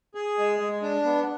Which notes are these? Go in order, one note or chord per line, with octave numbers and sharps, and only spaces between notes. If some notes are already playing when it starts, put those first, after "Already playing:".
G#4
G#3
G#3
D4
B3